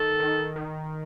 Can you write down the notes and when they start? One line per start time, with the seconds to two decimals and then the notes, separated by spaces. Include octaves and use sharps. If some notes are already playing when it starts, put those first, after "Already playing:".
Already playing: D#3 A4
0.20 D#3
0.56 D#3